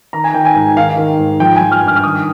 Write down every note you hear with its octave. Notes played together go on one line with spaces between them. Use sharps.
D#3 A#5
G#5
D#3 G5
G#5
G#2
D#3 F5
D#3
G#2
F3 G5
G#5
F3
F6
G2 F6
F6
D#3 D#6